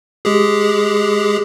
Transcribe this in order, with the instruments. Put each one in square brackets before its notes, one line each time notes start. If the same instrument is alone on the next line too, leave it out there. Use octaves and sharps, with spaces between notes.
[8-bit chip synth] G#3 G4 G#4